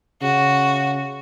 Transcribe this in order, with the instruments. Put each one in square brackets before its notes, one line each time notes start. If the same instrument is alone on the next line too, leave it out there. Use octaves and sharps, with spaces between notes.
[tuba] C#3 [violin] F#4